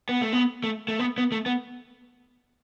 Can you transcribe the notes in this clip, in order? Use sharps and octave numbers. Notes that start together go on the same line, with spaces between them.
B3
A3
B3
A3
A3
B3
B3
A3
B3